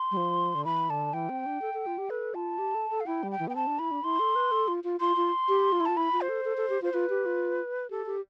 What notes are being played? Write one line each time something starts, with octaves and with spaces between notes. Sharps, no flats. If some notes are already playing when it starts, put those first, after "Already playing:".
Already playing: C6
G3
F3
D3
E3 B5
D3 A5
E3 G5
C4
D4
A4
A4
F4
G4
A4 B4
F4 A5
G4
A4
A4
F5
E4 G5
G3
G5
E3
B3 G5
C4 A5
D4
E4 B5
D4
E4 C6
A4
B4
A4
F4
F4
F4 C6
F4
G4
F4
E4
F4 A5
E4 B5
F4
C5
A4
A4
A4
G4
F4 C5
F4 B4
G4
F4
G4 A4
G4